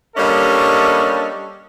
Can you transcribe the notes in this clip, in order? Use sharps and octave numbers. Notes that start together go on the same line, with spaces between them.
G3 A#3 C#4 D4 A4 D#5